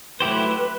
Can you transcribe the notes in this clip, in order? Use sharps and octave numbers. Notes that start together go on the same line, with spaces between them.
F#3 A3 E4 G4 B4 C5